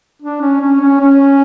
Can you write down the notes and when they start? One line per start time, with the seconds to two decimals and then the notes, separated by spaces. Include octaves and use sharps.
0.22 D4
0.41 C#4
0.61 C#4
0.81 C#4
1.00 C#4